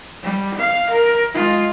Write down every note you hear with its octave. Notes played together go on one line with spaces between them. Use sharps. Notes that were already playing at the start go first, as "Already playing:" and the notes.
G3
F5
A#4
G#3 F4